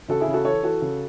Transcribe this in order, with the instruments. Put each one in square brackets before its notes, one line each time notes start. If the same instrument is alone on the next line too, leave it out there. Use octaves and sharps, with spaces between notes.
[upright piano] C#3 F#4 A4
E4 G#4
C#3
F#4 A4
E3 A4 C#5
E3 F#4 A4
C#3